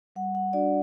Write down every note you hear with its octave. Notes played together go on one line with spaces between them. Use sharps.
G3 F#5
F#5
D4 F#4 D5